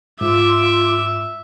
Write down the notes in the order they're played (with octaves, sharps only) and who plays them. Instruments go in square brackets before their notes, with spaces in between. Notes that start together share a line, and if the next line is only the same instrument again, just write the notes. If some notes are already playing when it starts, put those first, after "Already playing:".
[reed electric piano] G#2 [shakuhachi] F4 [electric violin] E5 [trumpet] D6